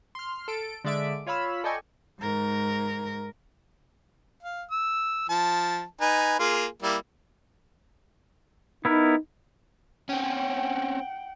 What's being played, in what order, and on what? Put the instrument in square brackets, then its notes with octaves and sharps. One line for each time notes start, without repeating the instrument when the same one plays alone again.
[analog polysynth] C6 F6
A4 D7
D3 G#3 D5 E5 D7
F4 C#5 F5 B5 E6
A4 D5 D#5 G5 G#5 C#6
[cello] G#2 A#4
[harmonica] F5
E6
F3 A5
D#4 B4 G#5
A#3 F4 G#4
G3 A#3 E4
[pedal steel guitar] B3 E4 A#4 [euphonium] D#4
[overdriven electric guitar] C4 C#4 [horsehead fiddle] F#5 G5